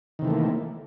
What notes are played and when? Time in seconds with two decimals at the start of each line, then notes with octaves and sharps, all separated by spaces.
0.19 D#3
0.22 C3
0.25 E3
0.28 A3
0.30 A#3